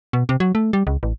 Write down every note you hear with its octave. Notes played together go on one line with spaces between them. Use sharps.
B2
C3
F#3
A3
G3
C#2
A1